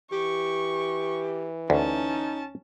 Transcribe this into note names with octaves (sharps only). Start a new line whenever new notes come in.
E3 G4 C#6
D2 C#4 D#4 A5